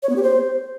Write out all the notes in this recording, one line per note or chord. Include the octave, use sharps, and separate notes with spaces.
C#5
B3
G4
C5